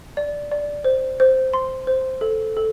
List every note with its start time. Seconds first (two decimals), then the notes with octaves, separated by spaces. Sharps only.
0.17 D5
0.52 D5
0.84 C5
1.20 C5
1.53 C6
1.87 C5
2.21 A4
2.57 A4